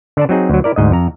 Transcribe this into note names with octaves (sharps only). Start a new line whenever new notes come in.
D3 D5 A5
F#3 C4 D#4 G#4
D2 F#3
E4 A#4 D5
D2 G#2 D#5
F2 A#5